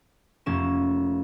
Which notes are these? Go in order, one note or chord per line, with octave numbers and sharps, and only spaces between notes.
F1 A#3 C#4 E7